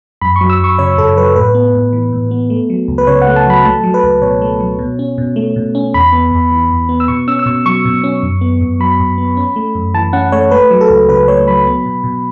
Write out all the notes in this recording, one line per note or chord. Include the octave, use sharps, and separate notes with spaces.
F#2 B5
C#6
F#3
E6
F#2 C#6
C#3 C#5
F#2 A4
F#3 B4
A2 B4
B3
A2
E3
A2
B3
A3
F#3
C#2
B4
C#3 C#5
F#5
A3
A5
F#3 B5
A3 A5
F#3
B4
C#2
B2 C#5
A3
F#3
B2
C#4
B2
A3
B2
C#4
E2 B5
B3
E2
E3
E2
B3
E6
B2 C#6
C#4 E6
E6
B2 C#6
F#3 C#6
B2
C#4
F#2
B3
F#2
F#3 B5
F#2
B3
C#4
A3
F#2
E3 A5
C#4 F#5
A3 C#5
A3 B4
F#3
A4
C#2
C#3 B4
A3 C#5
F#3 B5
B3
B2
B2